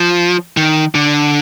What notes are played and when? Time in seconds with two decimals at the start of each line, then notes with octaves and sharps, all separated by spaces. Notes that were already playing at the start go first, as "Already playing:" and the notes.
Already playing: F3
0.57 D#3
0.95 D3